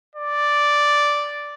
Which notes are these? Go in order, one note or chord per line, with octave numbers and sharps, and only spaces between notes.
D5